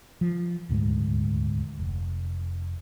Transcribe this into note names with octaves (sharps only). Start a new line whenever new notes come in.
F3
D#1 D2 G#2 G#3
F1